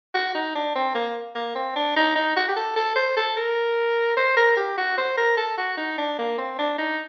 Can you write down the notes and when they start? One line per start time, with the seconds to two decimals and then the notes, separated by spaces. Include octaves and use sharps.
0.14 F#4
0.35 D#4
0.55 D4
0.75 C4
0.95 A#3
1.35 A#3
1.55 C4
1.76 D4
1.96 D#4
2.15 D#4
2.36 F#4
2.48 G4
2.56 A4
2.76 A4
2.96 C5
3.17 A4
3.37 A#4
4.17 C5
4.37 A#4
4.56 G4
4.77 F#4
4.97 C5
5.17 A#4
5.37 A4
5.57 F#4
5.77 D#4
5.98 D4
6.18 A#3
6.38 C4
6.58 D4
6.78 D#4